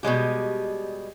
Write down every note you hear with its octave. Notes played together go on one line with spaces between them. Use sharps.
B2 G3 G#3 G4